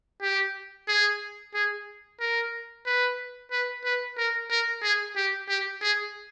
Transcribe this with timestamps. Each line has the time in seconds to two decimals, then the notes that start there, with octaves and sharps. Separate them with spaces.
0.22 G4
0.88 G#4
1.54 G#4
2.20 A#4
2.86 B4
3.51 B4
3.84 B4
4.18 A#4
4.50 A#4
4.83 G#4
5.16 G4
5.49 G4
5.82 G#4